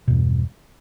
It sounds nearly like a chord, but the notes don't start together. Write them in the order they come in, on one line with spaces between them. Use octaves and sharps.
B2 E2 G2